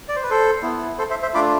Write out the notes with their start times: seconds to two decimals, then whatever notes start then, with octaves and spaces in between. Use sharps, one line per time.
0.09 D5
0.16 C5
0.23 B4
0.30 A4 C5
0.63 B3 E4
0.98 A4 C5
1.10 C5 E5
1.22 C5 E5
1.34 A3 D4 F4 B5 D6